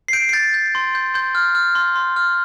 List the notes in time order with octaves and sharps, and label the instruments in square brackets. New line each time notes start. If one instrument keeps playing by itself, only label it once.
[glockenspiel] C7
G6 D7
C7
G6 A6
G6
C6
G6
C6 G6
F6
F6
C6
C6
F6